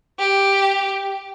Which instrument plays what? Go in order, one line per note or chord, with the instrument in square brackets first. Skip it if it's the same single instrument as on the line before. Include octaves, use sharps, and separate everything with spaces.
[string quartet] G4